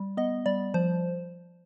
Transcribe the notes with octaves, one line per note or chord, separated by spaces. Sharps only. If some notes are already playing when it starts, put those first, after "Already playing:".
Already playing: G3
B3 D#5
G3 D5
F3 C5